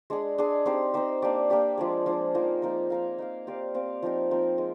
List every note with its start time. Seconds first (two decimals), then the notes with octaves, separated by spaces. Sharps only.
0.10 G#3 D4 G#4
0.38 G#3 D4 G#4
0.66 C4 D#4 G4 C5
0.94 C4 D#4 G4 C5
1.22 A#3 D4 G4 D5
1.50 A#3 D4 G4 D5
1.78 F3 G#3 D4 G#4
2.06 F3 G#3 D4 G#4
2.34 F3 A#3 D#4 A#4
2.62 F3 A#3 D#4 A#4
2.90 D#4 A#4 F5
3.18 D#4 A#4 F5
3.47 C4 G4 D5 F5
3.75 C4 G4 D5 F5
4.02 F3 C4 D#4 A#4
4.31 F3 C4 D#4 A#4
4.58 G#3